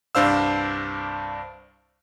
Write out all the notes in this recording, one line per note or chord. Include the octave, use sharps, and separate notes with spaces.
C2 G2 D4 C5 F5 E6